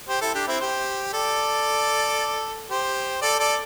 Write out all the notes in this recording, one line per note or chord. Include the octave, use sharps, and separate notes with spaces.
G4 C5
E4 A4
D4 G4
C4 E4
G4 C5
A4 D5
G4 C5
A4 D5
A4 D5